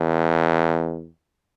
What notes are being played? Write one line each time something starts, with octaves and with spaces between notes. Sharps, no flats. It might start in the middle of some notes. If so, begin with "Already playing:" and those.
Already playing: E2